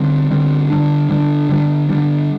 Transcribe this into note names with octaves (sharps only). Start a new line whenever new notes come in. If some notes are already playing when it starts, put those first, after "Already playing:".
Already playing: D3 G3 C4
D3 G3 C4
D3 G3 D4
D3 G3 D4
D3 G3 D4
D3 G3 D4